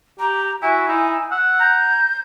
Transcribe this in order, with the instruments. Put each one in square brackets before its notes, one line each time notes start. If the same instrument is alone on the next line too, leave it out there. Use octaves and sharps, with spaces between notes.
[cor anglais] G4 [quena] A#5
[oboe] E4 [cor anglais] F#4 [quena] G#5
[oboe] D#4 [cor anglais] E4
[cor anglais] F#5 [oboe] E6
[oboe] A#5 [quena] G6